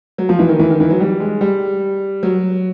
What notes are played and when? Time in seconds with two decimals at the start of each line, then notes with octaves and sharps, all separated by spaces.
0.18 F#3
0.29 F3
0.39 E3
0.49 D#3
0.59 E3
0.70 D#3
0.80 E3
0.90 F#3
1.00 G3
1.20 G#3
1.41 G3
2.23 F#3